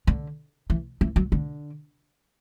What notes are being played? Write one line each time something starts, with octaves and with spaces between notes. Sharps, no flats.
D3
E3
E3
F#3
D3